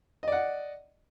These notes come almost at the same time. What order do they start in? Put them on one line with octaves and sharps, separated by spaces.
D#5 D5 F#5